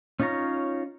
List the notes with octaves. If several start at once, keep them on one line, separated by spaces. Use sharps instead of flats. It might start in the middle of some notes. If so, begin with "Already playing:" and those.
C#4 D#4 F4 C#5 A#5